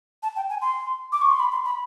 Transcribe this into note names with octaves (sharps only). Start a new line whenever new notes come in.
A5
G5
G#5
C6
D6
C#6
C6
B5
C6
B5